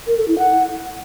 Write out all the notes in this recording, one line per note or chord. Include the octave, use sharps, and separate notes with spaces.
A#4
A4
E4
F#5